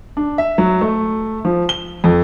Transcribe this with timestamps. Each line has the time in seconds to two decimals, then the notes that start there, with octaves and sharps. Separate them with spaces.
0.17 D4
0.38 E5
0.58 F#3
0.81 A3
1.45 F3
1.69 G7
2.04 F2